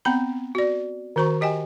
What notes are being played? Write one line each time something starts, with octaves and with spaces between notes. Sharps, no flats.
B3 C4 F#5 A#5 B5
F#4 D5
D#3 F#4 C5 A#5 C#6
G4 D#5 G5 G#5